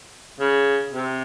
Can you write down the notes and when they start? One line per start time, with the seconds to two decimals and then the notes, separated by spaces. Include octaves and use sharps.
0.40 C#3
0.93 C3